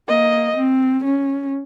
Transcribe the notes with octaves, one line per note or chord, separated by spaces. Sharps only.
A#3 D#5
C4
C#4